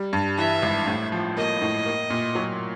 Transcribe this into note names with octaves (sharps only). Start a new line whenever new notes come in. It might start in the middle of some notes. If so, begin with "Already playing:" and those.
Already playing: G3
G2
E3 E5
G#1
A2
F3
A#3 D#5
A2
A#3
A#2
F#3